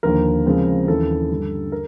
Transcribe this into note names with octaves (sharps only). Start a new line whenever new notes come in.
D#2 D3 F3 A#3 A#4
C#3 F3 G#3 C4
D#2 C#3 E3 A4
G2 D3 G3
A#4